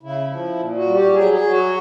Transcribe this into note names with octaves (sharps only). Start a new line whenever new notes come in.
C#3 E4
F3
A#2
F#4
G3
G4
F#3 G#4
G#4
F#3
F#4